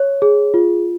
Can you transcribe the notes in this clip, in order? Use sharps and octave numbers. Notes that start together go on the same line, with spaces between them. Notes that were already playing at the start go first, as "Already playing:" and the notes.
Already playing: C#5
G#4
F4